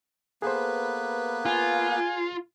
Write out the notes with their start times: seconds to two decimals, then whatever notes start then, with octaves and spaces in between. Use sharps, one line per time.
0.42 A#3 B3 G#4 A4 B4 C5
1.45 F4 G#5